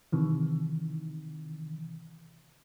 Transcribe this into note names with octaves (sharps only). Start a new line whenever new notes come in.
C3 D#3 E3